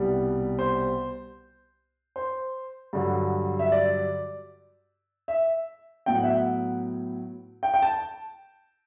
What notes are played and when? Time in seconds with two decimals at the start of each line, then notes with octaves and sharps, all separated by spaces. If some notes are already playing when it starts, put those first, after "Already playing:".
Already playing: C2 B2 G3 B3
0.59 C5
2.16 C5
2.93 G2 D3 F#3
3.59 E5
3.72 D5
5.28 E5
6.06 A2 F#3 B3 E4 G5
6.15 F#5
6.23 E5
6.32 F#5
7.63 G5
7.74 G5
7.82 A5